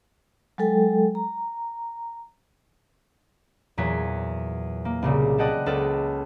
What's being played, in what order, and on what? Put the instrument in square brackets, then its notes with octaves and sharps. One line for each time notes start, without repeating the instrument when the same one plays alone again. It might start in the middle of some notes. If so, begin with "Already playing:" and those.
[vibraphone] F#3 G#3 A4 G5
A#5
[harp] E2 A#2 F#3 G#6 B6
A#3
C2 A#2 C#3
B4 D5 D#5 F#5 G5 A5
C#2 A4 B4 F6